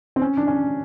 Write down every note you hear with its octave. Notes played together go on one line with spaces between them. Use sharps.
C4
C#4
D4
C#4